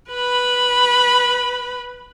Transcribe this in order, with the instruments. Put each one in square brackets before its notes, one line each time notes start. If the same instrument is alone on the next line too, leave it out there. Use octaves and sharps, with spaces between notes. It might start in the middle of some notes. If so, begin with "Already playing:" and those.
[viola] B4 B5